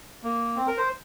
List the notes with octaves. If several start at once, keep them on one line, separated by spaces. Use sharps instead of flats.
A#3
C4
A#4
C5